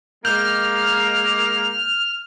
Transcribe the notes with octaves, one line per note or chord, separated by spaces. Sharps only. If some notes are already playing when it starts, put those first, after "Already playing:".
G#3 A#3 F6 G6